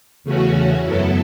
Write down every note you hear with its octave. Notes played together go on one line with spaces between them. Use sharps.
E2 C#3 A3 C#4 F#4
F#2 F#3 B3 E4 A4